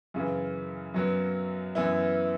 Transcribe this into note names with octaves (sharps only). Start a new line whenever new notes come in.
F#2 C#3 E3
F#2 F#3 B3
F#2 E3 B3 E4